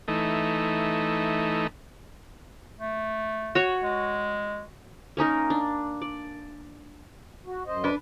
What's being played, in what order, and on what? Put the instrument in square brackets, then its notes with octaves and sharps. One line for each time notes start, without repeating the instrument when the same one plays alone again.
[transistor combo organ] E3 A3 D#4
[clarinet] A3
[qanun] F#4 C#5
[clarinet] G#3
[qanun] A#3 C#4 D#4 A#4
D4
D5
[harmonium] F#4
F#2 C5 D#5
[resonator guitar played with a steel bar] D4 B4